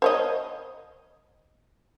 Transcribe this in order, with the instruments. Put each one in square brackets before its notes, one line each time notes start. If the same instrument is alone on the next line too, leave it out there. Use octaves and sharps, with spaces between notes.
[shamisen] C5 C#5 D#5